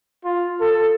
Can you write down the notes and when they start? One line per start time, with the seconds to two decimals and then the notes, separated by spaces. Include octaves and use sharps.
0.24 F4
0.61 A4